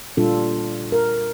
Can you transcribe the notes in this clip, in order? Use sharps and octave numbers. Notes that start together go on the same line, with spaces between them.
A#2 G3 D4 F4 A4
A#4